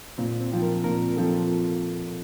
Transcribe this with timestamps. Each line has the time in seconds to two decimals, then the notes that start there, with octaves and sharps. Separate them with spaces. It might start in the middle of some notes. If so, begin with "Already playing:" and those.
0.18 A#2 C4
0.40 C4
0.52 F3 C4
0.62 A#4
0.84 A#2 A#4
1.17 F3 C4 A4